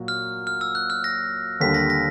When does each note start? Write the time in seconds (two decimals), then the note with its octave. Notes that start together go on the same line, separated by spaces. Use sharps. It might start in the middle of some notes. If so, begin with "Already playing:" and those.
Already playing: A#2 F#3
0.08 F6
0.47 F6
0.61 E6
0.75 F#6
0.90 F6
1.04 A#6
1.60 D#2 D3 G3 B6
1.74 A#6
1.90 A#6